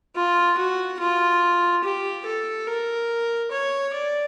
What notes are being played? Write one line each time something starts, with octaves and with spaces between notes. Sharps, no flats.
F4
F#4
F4
G4
A4
A#4
C#5
D5